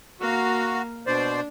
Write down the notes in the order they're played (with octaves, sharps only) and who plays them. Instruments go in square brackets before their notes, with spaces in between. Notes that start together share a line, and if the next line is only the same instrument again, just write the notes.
[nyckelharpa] A#3 F5 [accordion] F#4
[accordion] B2 C5 D5 [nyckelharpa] D4